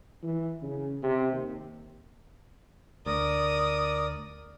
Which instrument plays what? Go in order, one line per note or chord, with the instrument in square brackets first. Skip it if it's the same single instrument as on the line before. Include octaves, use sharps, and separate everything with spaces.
[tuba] E3
C#3
C3
D#2
[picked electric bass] D2 [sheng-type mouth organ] A#4 D5 [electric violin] D#6